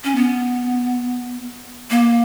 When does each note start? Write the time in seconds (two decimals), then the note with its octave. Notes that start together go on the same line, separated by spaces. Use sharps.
0.04 C#4
0.16 B3
1.90 A#3